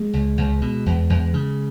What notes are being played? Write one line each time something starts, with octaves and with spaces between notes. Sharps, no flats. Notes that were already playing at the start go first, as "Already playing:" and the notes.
Already playing: G#3
C#2
C#2
B2
E2
E2
C#3